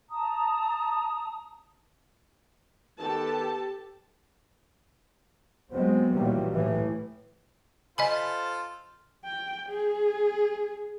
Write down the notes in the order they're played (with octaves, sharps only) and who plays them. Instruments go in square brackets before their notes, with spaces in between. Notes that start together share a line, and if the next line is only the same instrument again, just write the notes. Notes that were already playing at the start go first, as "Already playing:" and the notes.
[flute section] A5 A#5 D#6
[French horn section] D#3 B3 B4 [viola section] G4 A4 A5
[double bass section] F#3 G#3 B3 C4
A#2 D#3 E3 F#3 G3 A#3
A2 E3
[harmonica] F4 A4 C5 [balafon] D#5 G#5 B5
[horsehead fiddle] G5
G#4